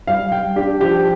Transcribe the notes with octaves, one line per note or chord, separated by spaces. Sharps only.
G3 F5
G3 G5
D4 G4
F3 G4